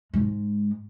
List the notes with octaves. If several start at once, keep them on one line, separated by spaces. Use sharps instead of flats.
G#2 G#3